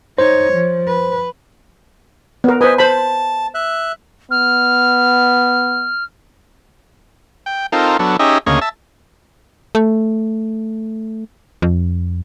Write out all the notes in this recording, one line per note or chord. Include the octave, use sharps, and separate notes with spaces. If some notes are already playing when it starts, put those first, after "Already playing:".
D#4 C5 C#5
F3
B4
B3 A#4
B4 C5 D#5 G#5
C5 A5 B5
E5 F#6
B3 F6
G5
C4 D#4 F4 A4 A#4
F#3 B3 D4 A4
C#4 D#4 G4 G#4 D#5 E5
D2 C#3 A#3 G#4 C#5 D#5
E5 A5
A3
F2